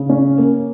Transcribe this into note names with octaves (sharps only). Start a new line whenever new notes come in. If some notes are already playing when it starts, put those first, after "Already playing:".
Already playing: C#3
C#4
A#3